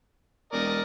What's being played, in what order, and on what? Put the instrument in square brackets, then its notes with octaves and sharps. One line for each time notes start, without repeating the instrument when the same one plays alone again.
[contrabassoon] E1 [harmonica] A#4 D5 D#5